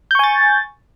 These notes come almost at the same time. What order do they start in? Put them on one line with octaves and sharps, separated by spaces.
G6 C#6 G#5 A6